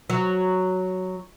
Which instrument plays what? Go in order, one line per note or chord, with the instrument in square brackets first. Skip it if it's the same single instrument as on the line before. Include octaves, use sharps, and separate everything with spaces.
[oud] F#3